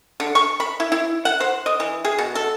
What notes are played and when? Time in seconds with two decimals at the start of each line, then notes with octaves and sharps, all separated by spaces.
0.20 D3
0.35 C#6
0.60 B5
0.80 E4
0.92 E4
1.25 F#5
1.40 C5
1.66 D#5
1.80 E3
2.05 G#4
2.18 B2
2.35 A4